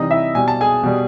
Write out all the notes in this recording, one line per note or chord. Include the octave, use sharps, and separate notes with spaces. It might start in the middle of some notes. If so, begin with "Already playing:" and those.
Already playing: C3 E3 G3 D#4 D#5
E4 E5
B2 G3 G#5
A5
G#4 G#5
B2 G3